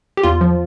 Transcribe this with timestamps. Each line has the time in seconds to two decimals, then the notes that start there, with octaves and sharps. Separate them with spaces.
0.17 G4
0.24 E2 F4
0.41 F3